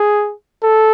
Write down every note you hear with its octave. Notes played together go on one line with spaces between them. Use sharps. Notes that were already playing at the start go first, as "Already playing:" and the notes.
Already playing: G#4
A4